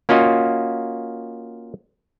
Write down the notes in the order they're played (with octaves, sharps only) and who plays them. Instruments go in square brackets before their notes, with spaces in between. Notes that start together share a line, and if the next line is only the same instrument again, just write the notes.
[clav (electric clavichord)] A#3 C#4 F4 F#4 D#5